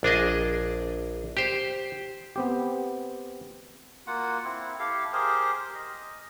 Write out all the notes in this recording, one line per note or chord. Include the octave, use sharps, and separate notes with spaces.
A#1 D4 G#4 D#5
G4 C5
B3 C4 G4
A#3 F4 F#4 F#5
C4 E4
E4 G4 A4 F5
G4 G#4 A#4 C5
D#5